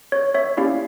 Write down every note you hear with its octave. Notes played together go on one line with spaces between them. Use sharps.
C#5
C#5 E5
A#3 C#4 E4 G4 D5 F5